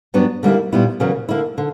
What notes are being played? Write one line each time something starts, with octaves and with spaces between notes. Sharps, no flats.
G2 F#3 B3 D4
D3 G3 A#3 E4
A#2 G3 B3 E4
E2 C#3 F#3 A#3
D3 A#3 E4
D3